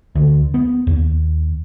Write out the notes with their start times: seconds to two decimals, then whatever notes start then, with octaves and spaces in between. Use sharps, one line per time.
0.15 D2
0.54 B3
0.87 D#2